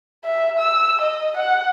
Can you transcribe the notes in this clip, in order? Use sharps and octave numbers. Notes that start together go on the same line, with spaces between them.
E5
E6
D#5
F#5